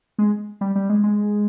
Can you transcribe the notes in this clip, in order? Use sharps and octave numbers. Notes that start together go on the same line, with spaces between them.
G#3
G3
G3
G#3
G#3